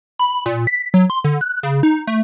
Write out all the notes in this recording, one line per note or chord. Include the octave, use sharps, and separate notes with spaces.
B5
A#2
B6
F#3
C6
D3
F#6
C#3
D#4
A3